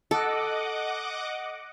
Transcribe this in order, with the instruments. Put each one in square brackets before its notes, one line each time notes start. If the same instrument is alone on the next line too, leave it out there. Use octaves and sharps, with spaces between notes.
[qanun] A4 [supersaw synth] D#5 F#5 D6